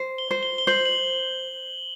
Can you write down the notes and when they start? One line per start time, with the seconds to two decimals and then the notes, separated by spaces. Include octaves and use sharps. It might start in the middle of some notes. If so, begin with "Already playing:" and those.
Already playing: C5
0.18 G7
0.31 C5
0.43 G7
0.58 G7
0.67 C5 F#7
0.85 F#7